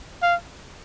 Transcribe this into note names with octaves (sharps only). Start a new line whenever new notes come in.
F5